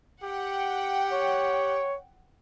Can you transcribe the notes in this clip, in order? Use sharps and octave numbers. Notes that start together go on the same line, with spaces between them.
G4 F#5 G5
C#5